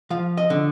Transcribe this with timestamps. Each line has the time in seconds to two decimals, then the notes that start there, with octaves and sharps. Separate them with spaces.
0.10 F3 F5
0.37 D#5
0.50 D3